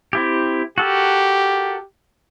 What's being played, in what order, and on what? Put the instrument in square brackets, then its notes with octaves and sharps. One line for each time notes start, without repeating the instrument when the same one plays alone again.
[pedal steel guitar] C4 E4 G4
[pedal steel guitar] F#4 A4 A#4 [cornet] G4